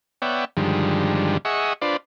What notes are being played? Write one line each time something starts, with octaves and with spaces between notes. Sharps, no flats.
B3 C#5 D5 E5 F#5 G5
G2 D3 D#3 F3 G3 G#3
G#4 D#5 E5 F#5 C#6
D4 F4 B4 C5 D5